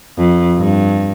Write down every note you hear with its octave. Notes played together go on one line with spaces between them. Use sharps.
F2
G2